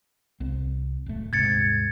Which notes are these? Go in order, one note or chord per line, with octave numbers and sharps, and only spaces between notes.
C2 C4
D1 A3
D#1 G#2 C3 G#6 A6 C#7